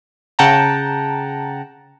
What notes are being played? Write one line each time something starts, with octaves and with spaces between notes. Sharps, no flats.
C#3 F#5 G5 A5 A#5